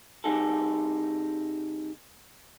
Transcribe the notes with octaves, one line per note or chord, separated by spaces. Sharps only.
C2 G3 D#4 G#4 A4